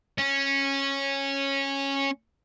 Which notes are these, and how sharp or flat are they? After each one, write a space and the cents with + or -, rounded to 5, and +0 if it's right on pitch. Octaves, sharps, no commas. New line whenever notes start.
C#4 -10